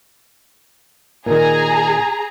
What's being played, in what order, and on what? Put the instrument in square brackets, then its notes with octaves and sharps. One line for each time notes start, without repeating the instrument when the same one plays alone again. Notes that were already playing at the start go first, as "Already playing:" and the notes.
[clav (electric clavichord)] A#2 D#3 [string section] G#4 A#5